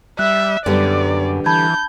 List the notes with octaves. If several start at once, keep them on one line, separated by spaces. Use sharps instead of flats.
G3 E5 F#6
F#2 D3 G3 B3 D5
E3 A5 B5 G6 G#6